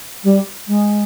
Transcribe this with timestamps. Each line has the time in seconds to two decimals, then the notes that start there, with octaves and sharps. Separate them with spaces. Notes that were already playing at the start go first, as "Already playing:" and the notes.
0.24 G3
0.67 G#3